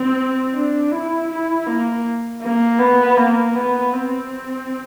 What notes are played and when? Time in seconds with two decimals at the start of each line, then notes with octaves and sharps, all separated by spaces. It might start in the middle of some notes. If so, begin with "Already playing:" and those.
Already playing: C4
0.54 D4
0.92 E4
1.29 E4
1.67 A#3
2.42 A#3
2.79 B3
3.17 A#3
3.55 B3
3.93 C4